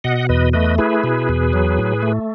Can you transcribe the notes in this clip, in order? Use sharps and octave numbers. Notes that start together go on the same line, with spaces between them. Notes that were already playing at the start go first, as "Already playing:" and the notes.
B2 D#5 F#5
E2 B4 D#5
A3 B4 D#5
E4 G#4 B4
B2
E2
F#3
A2
A3